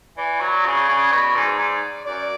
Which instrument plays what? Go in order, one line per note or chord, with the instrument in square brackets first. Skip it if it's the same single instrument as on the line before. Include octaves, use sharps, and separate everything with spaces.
[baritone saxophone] E3 [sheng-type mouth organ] D5
[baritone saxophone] F#3
C#3
C#3
B2
G#2
G#2
[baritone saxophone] F#2 [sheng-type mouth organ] D5